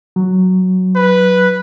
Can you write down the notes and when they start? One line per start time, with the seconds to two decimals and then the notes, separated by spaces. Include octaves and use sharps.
0.16 F#3
0.96 B4